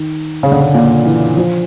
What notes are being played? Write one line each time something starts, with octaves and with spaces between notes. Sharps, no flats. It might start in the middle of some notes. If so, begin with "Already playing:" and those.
Already playing: D#3
C#3
D3
C#3
A#2
E3
F3